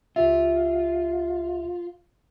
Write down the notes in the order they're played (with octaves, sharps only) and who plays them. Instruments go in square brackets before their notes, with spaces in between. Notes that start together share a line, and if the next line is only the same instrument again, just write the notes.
[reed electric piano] C#2 G4 E5 [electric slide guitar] F4